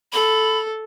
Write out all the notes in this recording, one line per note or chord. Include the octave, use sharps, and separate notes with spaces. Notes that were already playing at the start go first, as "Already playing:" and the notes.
A4 B5